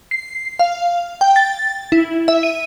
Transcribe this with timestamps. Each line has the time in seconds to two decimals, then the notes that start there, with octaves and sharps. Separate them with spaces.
0.11 C7
0.59 F5
1.21 G5
1.36 A6
1.92 E4
2.28 E5
2.43 D#7